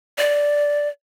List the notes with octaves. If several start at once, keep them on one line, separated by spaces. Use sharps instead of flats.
D5